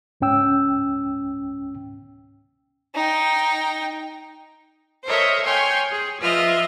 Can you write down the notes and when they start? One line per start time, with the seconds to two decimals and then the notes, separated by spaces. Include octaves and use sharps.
0.21 C#2 G#2 C#4 G5 E6
2.95 D#4 G5
5.05 A4 A#4 C5 C#5 D#5 E5
5.45 C#5 G5 G#5 C6 C#6 F6
5.90 G#4
6.21 F3 F4 B4 D#5 E5 F6